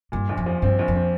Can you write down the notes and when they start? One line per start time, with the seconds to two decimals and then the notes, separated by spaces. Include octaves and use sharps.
0.12 G2 A#2
0.29 A#1
0.37 F2
0.46 F3
0.62 G2 C4
0.79 A#1
0.88 F2
0.96 C4